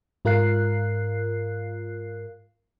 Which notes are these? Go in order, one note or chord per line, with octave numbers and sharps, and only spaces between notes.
G#2 F4 A#4 F5 F#6 C7